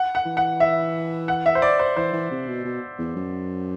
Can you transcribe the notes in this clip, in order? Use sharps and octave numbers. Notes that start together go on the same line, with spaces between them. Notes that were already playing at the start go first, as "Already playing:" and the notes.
Already playing: F#5
F#5
E3
F#5
E5
F#5
E5
C5
D5
C5
E3 C5
E3
C3
B2
B2
E2
F#2